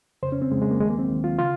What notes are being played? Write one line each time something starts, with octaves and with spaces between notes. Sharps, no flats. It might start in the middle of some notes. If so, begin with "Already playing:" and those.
F2 C#3 C5
C#4
C4
F2 C#3 G#3
G#3
A#3
D#2 D#3 G#3
A#3
C4
D#2 D#3
F4
C#3 F4